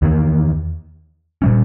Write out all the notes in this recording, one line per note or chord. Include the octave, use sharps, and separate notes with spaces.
E2 D#3 A#3
A#2 G3 C#4